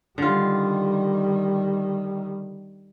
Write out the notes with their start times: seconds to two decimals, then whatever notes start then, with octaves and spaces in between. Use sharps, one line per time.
0.18 D3 D#3 G3 F4